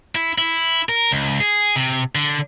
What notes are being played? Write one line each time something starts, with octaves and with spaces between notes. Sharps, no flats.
E4
E4
A#4
C#2
G#4
C3
D3